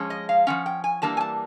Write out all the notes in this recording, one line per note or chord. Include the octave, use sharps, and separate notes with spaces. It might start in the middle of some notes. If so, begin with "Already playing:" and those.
Already playing: F3 G#3 C#4
D#5
F5
F3 G#3 C#4 F#5
G5
G#5
E3 G3 A#3 D4 A5
G#5
A5